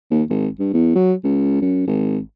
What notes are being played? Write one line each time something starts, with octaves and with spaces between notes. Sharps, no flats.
D#2
G#1
G2
E2
F#3
C#2
F#2
G#1